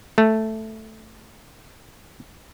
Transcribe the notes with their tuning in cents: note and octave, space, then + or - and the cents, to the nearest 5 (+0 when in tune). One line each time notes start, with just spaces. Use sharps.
A3 +0